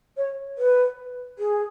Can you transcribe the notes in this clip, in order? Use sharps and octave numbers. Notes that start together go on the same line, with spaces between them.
C#5
B4
G#4